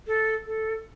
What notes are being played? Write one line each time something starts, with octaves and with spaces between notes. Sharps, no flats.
A4
A4